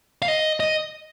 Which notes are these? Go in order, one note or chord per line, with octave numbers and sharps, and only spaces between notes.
F5
D#5
D#5